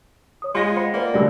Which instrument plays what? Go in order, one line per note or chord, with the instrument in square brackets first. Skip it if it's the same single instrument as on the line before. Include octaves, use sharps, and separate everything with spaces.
[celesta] C#5 D#6
[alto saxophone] G#3 [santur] F4 [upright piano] C6 A#6
[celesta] C5 B5 C#7 [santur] F#5 G5
[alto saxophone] A#3 [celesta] B4 C5 D#5 [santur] D5
[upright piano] D2 D3 G3 [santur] A3 G4 G#4 [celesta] E6 A#6